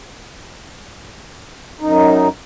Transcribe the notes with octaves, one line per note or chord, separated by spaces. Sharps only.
F#2 D#4